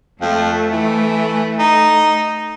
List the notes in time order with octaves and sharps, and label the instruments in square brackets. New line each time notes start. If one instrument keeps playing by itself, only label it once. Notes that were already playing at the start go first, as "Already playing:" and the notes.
[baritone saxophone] F2 [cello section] A3
[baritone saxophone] E3
D#4